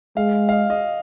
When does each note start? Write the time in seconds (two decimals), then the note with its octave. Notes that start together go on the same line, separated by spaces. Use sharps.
0.17 G#3 F5
0.49 F5
0.52 D#5
0.70 D#5